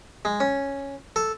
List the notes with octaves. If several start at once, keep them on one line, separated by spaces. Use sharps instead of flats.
G#3
C#4
A4